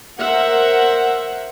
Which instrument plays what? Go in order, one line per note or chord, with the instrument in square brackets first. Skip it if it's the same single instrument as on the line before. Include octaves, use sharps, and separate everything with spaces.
[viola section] A#4 C5 E5 F#5